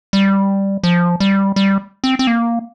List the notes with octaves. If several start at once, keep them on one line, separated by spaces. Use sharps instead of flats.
G3
F3
G3
G3
C4
C4
A#3